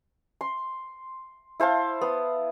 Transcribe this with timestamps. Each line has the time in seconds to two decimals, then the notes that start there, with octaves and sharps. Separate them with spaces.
0.41 C6
1.60 E4 C5 F5 A5
2.01 B3